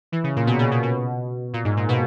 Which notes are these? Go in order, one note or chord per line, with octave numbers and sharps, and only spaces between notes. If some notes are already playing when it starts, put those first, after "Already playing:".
E3
C#3
A#2
B2
C#3
B2
B2
A#2
G#2
A#2
B2